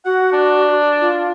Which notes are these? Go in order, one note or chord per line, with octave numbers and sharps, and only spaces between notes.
F#4 F#5
D4
F4